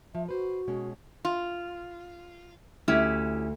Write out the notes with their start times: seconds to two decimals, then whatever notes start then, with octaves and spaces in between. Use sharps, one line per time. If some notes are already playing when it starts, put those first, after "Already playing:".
0.15 F3 E5
0.29 F#4 B4 C5
0.68 B2 G#3 C#4
1.25 F4
2.88 D2 C#4 E4 G4